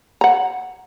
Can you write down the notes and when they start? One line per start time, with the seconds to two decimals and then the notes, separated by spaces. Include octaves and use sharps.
0.21 F#5 A#5